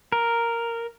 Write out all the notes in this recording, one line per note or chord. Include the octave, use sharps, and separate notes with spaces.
A#4